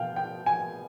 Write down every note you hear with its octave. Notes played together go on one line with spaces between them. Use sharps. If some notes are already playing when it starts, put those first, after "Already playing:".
Already playing: B2 B3 F5 G5
G5
G#5